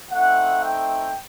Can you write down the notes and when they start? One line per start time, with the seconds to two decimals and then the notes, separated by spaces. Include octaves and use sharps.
0.12 A3 C4 D#4 F#5
0.63 G5